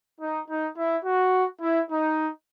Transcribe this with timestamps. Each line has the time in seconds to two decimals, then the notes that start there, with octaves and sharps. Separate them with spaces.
0.19 D#4
0.48 D#4
0.76 E4
1.04 F#4
1.60 E4
1.89 D#4